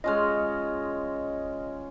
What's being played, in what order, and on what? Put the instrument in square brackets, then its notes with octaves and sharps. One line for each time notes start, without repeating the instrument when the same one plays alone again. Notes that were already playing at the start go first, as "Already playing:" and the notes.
[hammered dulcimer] G#3 C#4 F4 [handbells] D#5 F6